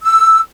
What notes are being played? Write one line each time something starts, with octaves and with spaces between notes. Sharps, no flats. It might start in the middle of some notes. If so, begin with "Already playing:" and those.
E6